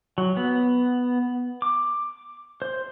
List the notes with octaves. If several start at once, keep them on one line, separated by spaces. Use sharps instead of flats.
F#3
B3
D6
C5